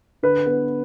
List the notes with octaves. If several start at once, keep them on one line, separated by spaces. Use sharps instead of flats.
D3 B4
B3